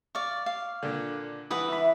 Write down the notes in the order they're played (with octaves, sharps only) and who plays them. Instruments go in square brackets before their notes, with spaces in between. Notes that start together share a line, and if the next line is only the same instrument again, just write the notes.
[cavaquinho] D5 F5 [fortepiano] C#6
[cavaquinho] F5
[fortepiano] A#2 D3
[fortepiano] E3 [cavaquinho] B4 F#5 D#6
[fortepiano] E3 B5 [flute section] E5